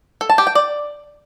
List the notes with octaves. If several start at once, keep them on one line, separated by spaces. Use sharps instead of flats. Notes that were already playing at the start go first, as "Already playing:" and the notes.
A4
A5
G4
G5
D5